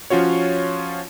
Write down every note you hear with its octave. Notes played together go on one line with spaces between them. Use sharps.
F3 C#4 F4 F#4 C#5